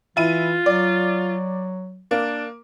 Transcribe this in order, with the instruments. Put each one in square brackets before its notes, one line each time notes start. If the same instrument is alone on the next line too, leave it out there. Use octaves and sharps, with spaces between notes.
[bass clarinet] E3 [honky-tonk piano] E4 D#7 [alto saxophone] F4
[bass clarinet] F#3 [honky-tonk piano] D5
[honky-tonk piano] A#3 [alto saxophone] D4